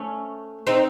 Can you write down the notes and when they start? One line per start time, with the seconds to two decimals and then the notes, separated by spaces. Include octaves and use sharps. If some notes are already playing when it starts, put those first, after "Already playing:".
Already playing: A3 C#4
0.67 C4 D#4